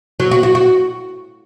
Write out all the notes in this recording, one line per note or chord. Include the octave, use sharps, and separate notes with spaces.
F#3
F#4
F#4
F#4